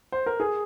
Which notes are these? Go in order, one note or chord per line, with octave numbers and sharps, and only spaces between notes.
C5
A#4
G#4